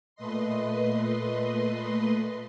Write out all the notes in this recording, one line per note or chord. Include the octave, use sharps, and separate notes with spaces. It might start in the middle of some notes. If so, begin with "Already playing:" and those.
A#2 A3 B4 D#5 C6